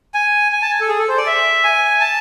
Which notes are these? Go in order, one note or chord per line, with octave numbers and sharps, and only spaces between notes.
G#5
G#5
A5
G#5
A4
G#4
A4
C5
D5
E5
G#5
A5